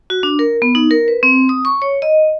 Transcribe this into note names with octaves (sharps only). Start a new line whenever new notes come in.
F#4
D4
A#4
B3
D#4
A#4
B4
C4
D#6
C#6
C#5
D#5